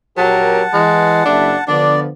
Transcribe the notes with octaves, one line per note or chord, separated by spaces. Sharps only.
A#1 F#3 G4 A#4 F#5 A5
E3 G#3
F#1 D4 E4 E5
D3 F3 B3 D4 D5